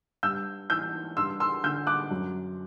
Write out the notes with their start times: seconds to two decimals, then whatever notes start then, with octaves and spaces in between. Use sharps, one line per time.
0.23 G2 E6 G6
0.70 E3 E6 G6
1.17 G2 C6 E6
1.40 C6 E6
1.64 D3 E6 G6
1.87 D6 F#6
2.11 F#2